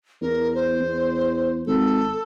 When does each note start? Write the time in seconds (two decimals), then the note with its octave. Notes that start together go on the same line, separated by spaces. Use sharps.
0.22 E2 A#4
0.55 C5
0.80 E2
1.66 G#1 A4